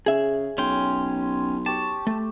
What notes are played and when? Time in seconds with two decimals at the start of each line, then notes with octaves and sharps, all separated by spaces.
0.06 C#3 G#4 E5
0.58 B1 C#4 G5 C6
1.66 G4 C#5 A5
2.07 A3